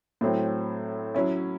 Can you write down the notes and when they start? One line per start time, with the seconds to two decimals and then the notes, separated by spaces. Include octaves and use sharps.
0.21 A2 F#3 C4 E4
1.14 F#3 C#4 E4